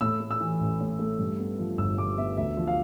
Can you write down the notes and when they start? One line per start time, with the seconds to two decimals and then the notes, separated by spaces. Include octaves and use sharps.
0.01 A2 E6
0.20 A3
0.31 E6
0.40 E3
0.61 A1
0.80 A2
0.99 A3
1.19 G2
1.39 B3
1.59 F3
1.78 G1 E6
1.98 G2 D6
2.18 B3 E5
2.37 D2 E5
2.57 F3
2.67 F5